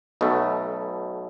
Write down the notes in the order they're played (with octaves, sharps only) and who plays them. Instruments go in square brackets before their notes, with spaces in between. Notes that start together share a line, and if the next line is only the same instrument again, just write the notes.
[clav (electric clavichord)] B1 B2 A3